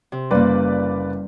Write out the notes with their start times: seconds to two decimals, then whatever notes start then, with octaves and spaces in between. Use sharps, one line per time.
0.12 C3
0.31 F#1 G3 A#3 B4 D5